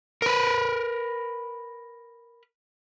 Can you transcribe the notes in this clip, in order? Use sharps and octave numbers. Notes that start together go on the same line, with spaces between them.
A#4 B4